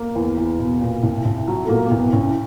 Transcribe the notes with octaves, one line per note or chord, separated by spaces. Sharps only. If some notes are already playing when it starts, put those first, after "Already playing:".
Already playing: A#3
E2
E2
B2
A#2
C2
C2
F#3
A3
A#2 A#3
A#3
C2 B3
C2 C#4